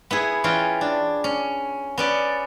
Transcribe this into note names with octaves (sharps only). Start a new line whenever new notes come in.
B3 E4 G#4
E3 C#4 F4 G#4 F5 G5
D4
C#4
B3 C#4 D5